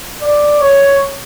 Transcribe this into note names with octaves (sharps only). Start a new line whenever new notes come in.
D5
C#5